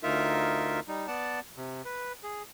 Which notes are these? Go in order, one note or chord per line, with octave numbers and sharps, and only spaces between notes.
D2 D#4 F4 A#4 E5
G3 D#4
B3 D5 F#5 A5
C3
B4
G#4